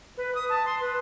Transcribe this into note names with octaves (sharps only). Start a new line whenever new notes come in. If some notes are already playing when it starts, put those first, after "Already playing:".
B4
D#6
A5
C6
B4